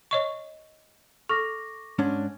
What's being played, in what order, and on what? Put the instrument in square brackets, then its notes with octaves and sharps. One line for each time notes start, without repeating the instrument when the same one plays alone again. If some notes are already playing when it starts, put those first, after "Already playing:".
[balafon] C#5 D#5 C#6
[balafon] A4 [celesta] C#6 D6 A#6
[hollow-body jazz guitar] G#2 C#4 D4